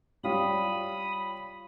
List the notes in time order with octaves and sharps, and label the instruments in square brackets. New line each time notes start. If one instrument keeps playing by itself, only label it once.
[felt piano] G3 F4 C#5 [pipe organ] B5 D#6